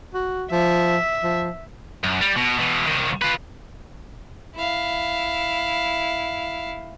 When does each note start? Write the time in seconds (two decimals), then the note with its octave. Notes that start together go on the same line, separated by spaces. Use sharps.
0.14 F#4
0.51 F3 E5
1.23 F3
2.04 F#2
2.21 G3
2.36 B2
2.59 B2 E3
2.87 C2 D#3
3.22 F4 B4
4.56 E4 F5